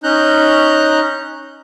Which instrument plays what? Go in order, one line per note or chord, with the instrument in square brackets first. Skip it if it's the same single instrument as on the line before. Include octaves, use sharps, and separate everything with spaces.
[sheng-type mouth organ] C#4 D#4 A#5 F#6 G6